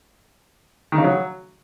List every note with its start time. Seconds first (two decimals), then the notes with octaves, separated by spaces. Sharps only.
0.92 D#3
0.98 C#3
1.04 F#3